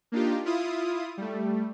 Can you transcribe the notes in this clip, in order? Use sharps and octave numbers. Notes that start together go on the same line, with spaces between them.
A#3 D4 D#4 F4 G4
E4 F4 D#6
G3 A3